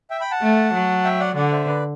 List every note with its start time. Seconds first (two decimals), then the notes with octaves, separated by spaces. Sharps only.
0.10 E5 G5
0.21 G5 B5
0.31 F#5 A5
0.42 A3
0.73 F#3
1.04 E5 G5
1.20 D5 F#5
1.36 D3 D5 F#5
1.51 C5 E5
1.67 B4 D5